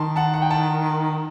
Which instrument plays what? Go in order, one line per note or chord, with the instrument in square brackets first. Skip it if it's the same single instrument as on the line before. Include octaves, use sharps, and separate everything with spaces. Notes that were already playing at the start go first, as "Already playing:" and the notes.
Already playing: [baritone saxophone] D#3 [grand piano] A5 C6
[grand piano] F#5 A5
F#5
G5
F#5 A5